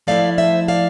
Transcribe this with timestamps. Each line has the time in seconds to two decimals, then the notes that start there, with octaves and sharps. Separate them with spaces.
0.07 F3 A3 E4 D5 F5
0.38 C5 E5
0.68 D5 F5